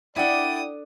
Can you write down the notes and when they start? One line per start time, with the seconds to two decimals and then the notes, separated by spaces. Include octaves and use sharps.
0.16 D4 E4 A4 D5 F#5 G5 D#6